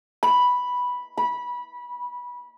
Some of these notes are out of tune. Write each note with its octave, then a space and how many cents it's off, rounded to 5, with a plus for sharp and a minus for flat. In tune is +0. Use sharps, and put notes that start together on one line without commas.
B5 -5
B5 -20